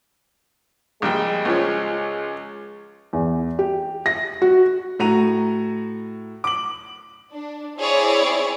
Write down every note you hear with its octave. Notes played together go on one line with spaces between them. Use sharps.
A#1 G3 G#3 G5
C#2 F3 C#5
E2
G4
A#6
F#4
A2 F#4 A#5 D#7 F7
D6 F#7
D4
C4 E4 G#4 C#5 D5